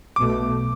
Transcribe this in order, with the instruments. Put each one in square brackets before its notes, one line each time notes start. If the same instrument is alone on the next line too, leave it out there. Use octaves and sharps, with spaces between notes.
[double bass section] B1 B2 A3 [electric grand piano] D6